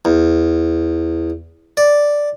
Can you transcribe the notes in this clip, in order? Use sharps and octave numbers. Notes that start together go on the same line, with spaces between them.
E2
D5